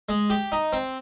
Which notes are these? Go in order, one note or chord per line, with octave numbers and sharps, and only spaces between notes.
G#3
G4
D#4
C4